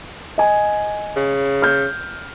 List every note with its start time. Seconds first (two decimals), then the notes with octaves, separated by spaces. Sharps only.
0.38 D#5 G#5
1.16 C#3
1.62 F6 G6